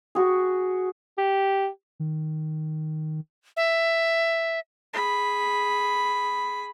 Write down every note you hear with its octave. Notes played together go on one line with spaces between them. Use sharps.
F#4 G#4
G4
D#3
E5
G#4 B5